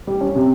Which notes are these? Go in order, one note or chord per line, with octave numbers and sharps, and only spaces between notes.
G3
C#4
C3